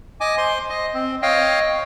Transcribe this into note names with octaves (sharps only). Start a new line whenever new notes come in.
D#5 G#5 D6
C5 C6
D#5
C4
C#5 D#5 F5 G5